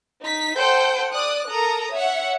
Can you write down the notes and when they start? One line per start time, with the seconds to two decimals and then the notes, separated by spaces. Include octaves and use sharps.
0.22 D#4 B6
0.56 A4 C5 F#5 G5 G6
1.12 D5 D#6 F#6
1.49 A4 A#4 A#5 D#6
1.93 C#5 E5 F#5